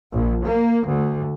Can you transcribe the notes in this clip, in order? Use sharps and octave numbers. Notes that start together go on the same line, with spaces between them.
A#1
A#3
D2